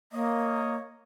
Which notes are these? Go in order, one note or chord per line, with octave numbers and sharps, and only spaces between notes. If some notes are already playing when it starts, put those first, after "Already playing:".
A#3 C#5 D#5